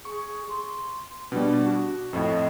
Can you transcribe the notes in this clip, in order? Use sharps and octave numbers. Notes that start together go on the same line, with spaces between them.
G#4 C#6
C6
B2 G3 D4
F#4
F2 A2 D#5